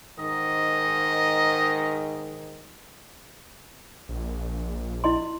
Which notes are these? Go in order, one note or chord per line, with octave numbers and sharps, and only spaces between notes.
G#2 D#3 D#5
A#1
E4 D#5 C6